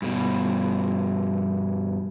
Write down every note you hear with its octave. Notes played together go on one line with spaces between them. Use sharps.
G2 B2